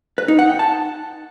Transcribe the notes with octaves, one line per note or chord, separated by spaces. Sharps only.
B4
D#4
F#5
G5
A5